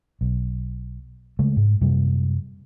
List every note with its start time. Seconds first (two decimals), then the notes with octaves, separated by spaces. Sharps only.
0.21 B1
1.39 C#3 G#3 A3
1.57 G#2
1.81 F#2 C3 G3